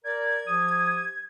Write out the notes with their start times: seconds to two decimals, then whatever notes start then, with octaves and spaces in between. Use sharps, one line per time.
0.05 A#4 D5 G#6
0.47 F3 G4 D#6